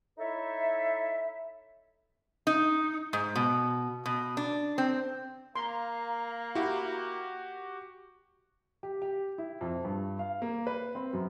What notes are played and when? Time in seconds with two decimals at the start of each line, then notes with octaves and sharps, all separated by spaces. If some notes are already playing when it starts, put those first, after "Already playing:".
0.18 D#4 E4 A4 C#5 E5
2.47 D#4
3.13 G#2
3.35 B2
4.06 B2
4.37 D4
4.78 C4
5.56 A#3 F5 A#5 C6
6.55 E4 F#4 G4
8.83 G4
9.02 G4
9.38 E4
9.61 F2
9.85 G2
10.19 F5
10.42 A#3
10.67 B4
10.95 C4
11.13 F#2